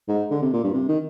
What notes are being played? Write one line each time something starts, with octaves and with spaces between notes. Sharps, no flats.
G#2
D3
C3
A#2
G2
C3
D#3